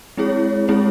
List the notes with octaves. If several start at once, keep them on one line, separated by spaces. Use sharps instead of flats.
G#3 C4 E4 G#4 C#5
G#3 C4 E4 G#4 C#5